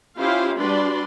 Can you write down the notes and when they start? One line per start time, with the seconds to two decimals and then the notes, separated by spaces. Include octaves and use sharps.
0.18 C#4 E4 F4 G4 C5 F5
0.57 G3 D4 F#4 B4 D5 C6